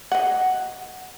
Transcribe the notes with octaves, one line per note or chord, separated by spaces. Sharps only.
D#5 F#5